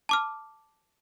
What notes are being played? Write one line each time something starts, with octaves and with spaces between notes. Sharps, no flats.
A5 D6 F6